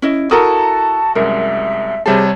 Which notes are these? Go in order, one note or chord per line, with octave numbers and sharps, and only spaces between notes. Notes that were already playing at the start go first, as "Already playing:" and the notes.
C#4 E4 D#5
E4 F#4 A4 A#4 A5 A#5 D#6
C2 F#2 G#3 A#4 E5
C3 G3 G#4 C5 C#5 E5 A5